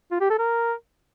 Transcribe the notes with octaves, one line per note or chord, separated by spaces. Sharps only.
F4
G4
A4
A#4